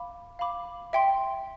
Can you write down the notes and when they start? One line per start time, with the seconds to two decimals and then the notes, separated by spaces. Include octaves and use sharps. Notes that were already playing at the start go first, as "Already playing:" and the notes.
Already playing: F5 B5 D6
0.39 F5 B5 D6
0.93 E5 G5 C6